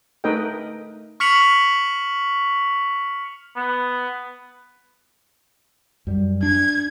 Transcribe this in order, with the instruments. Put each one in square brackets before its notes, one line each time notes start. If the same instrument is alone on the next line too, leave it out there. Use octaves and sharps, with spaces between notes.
[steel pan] A3 D#4 A#4 B4 D#5 G5
[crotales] C#6 F6 B6 C#7 F7 F#7
[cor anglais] B3
[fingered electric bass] F#2 G3
[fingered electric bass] D4 [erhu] G#6